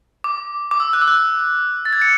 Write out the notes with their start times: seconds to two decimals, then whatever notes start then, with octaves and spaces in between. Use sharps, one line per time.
0.24 D6
0.71 D6
0.80 E6
0.93 F#6
1.02 E6
1.08 F#6
1.85 A6
1.93 G#6
2.02 C#7